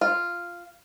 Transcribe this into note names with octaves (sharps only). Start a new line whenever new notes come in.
F4